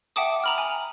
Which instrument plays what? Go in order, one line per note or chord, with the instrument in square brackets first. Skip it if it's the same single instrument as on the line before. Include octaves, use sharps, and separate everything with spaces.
[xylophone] E5 F#5 G5 A5 D6 D#6
A#5 B5 F6
G#5